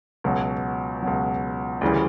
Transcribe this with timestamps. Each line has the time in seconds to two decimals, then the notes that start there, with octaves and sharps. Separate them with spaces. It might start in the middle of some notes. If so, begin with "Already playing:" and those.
0.24 C#2 B2 F#3
1.03 C#2 B2 F#3
1.81 D2 C#3 E3 G3